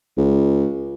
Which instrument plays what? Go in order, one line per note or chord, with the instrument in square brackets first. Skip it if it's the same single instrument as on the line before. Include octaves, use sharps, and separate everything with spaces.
[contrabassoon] C#2